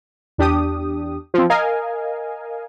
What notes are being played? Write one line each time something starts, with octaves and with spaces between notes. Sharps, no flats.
E2 D4 G4 D#6
F3 C4
A#4 D#5 F5 G#5